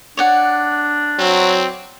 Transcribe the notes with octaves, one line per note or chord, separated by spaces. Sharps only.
D4 C#5 D5 F#5
F#3 C4